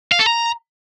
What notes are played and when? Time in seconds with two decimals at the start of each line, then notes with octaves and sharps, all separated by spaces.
0.12 F5
0.19 A4
0.26 A#5